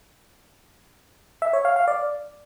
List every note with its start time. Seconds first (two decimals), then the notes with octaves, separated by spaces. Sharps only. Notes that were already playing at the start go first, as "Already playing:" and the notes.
1.42 E5
1.53 C#5
1.65 F5
1.76 F5
1.88 D5